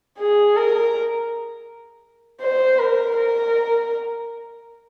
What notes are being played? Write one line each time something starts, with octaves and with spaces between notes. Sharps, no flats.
G#4
A#4
C5
A#4
A#4